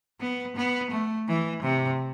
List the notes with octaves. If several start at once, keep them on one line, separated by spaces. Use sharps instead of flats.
B3
B3
A3
E3
C3